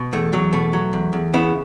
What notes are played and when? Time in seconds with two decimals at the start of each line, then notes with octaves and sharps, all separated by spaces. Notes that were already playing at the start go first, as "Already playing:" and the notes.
Already playing: B2
0.13 E2 A3
0.33 E2 F#3
0.53 B2 A3
0.73 F#3
0.93 E2
1.13 E2
1.33 C#3 B3 E4